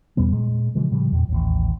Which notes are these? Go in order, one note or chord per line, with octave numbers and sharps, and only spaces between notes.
E2 B2 G3 B3
A#2 G#3
C#3 E3 F3 G#3
A2 C#3 F3 G3
E2 A#2
A1 D#2